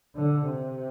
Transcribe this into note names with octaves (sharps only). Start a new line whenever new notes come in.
D3
C3